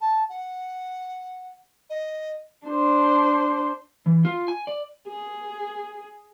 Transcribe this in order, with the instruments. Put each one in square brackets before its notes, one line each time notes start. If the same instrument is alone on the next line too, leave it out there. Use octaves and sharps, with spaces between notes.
[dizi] A5
F#5
D#5
[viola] D4 C5
[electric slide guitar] E3
F4
G#5
D5
[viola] G#4